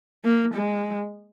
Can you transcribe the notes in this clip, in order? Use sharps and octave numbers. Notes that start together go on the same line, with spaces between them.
A#3
G#3